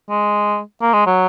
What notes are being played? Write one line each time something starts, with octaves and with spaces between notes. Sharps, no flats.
G#3
A#3
G#3
F#3